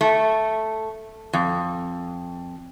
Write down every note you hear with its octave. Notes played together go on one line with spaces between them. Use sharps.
A3
F2